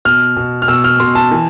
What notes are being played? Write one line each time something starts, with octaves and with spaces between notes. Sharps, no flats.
B2 F6
B2
F6
B2 E6
F6
B2 C6
A5
E3